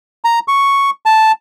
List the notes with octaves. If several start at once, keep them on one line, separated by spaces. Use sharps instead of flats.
A#5
C#6
A5